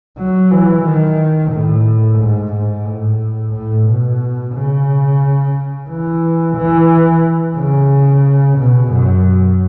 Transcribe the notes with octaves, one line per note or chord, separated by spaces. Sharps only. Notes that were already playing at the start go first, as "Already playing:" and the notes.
F#3
E3
D#3
A2
G#2
G#2
A2
A2
B2
C#3
E3
E3
C#3
B2
F#2